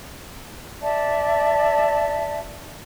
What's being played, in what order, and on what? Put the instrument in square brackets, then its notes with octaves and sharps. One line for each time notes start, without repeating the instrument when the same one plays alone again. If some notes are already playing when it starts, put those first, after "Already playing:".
[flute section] D5 E5 A5